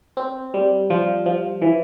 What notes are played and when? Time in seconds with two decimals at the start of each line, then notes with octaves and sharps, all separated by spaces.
0.17 C4
0.54 G3
0.90 F3
1.26 F3
1.62 E3